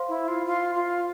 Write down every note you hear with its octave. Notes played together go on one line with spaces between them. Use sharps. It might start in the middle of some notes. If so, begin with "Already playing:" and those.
Already playing: C5 F5 C6
E4
F4
F4
F4